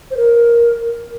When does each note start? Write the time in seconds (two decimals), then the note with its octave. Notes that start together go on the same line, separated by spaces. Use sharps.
0.11 C5
0.17 A#4